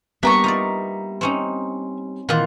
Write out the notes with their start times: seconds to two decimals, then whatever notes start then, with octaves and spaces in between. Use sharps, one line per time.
0.23 G3 A#3 B3 D4 E5 A#5 C#6
0.44 D#4 F4 D5
1.21 C4 C#4 D#4
2.29 A#2 D#3 E3 F4 F#5